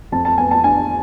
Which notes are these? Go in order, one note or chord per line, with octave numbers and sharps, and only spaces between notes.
F2 A5
A5
B3 G#5
A5
D4 G#5